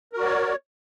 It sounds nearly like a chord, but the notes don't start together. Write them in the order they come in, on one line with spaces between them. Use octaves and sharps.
A#4 F#4 D5 C#5